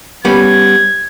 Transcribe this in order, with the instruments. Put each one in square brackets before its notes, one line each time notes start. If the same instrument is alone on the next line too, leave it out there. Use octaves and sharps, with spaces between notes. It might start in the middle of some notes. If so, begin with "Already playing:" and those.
[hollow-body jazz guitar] G3 B3 C#4 [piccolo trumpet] G#6